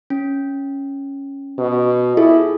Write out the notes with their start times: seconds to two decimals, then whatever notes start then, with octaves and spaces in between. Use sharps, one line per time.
0.10 C#4
1.59 B2
2.17 E4 F4 G#4 A4